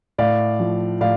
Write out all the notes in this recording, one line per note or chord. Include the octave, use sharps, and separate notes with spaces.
A2 D5 F5
F3
A2 D5 F5